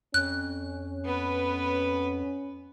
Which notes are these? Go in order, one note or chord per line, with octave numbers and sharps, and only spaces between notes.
F2 C#4 F#6
B3 B4